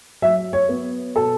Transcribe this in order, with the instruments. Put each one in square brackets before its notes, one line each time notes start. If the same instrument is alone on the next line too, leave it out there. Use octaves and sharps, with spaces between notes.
[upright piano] F#3 E5
C#5
B3
B2 A4